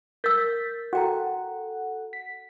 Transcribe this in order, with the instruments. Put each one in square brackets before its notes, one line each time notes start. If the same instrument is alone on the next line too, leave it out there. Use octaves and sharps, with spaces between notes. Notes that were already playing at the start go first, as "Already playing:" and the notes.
[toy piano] A#4 E6 [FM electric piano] G6 A6 B6
[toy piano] F#4 G5 A#5 [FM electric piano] A4 F#5
[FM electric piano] B6